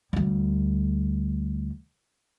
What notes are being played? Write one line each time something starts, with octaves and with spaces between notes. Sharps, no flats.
D2 G3